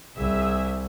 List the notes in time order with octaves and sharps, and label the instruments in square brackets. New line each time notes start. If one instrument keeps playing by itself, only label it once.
[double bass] C2 [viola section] G#4 E5